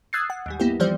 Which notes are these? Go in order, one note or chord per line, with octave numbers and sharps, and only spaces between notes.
D#6 E6 F#6 G#6 A6 C7
F#5
D#2 G#2 G3
A#3 B3 E4 G4
E3 F3 G3 G4 C5 D5